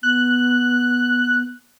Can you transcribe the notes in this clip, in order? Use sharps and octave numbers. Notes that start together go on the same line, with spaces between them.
B3 F#6